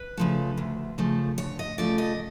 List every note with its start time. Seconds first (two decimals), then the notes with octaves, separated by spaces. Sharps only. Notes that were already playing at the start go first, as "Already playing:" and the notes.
Already playing: B4
0.17 C#3 F3 A3
0.58 D2
0.98 C#3 F3 A3
1.38 D2 C#5
1.59 D#5
1.78 C#3 F3 A3 D5
1.98 D#5